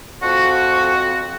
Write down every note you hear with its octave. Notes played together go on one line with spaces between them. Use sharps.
F2 F#4